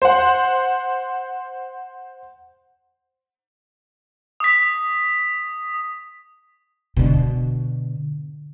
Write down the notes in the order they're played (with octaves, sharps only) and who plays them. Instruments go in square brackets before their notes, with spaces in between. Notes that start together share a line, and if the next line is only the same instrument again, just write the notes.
[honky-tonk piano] C5 F#5
[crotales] D#6 B6
[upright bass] B2 D3